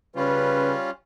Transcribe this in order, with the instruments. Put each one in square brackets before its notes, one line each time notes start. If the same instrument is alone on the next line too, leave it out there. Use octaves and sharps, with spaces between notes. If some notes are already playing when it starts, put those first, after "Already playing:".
[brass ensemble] C#3 B4 [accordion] G3 C#4 F4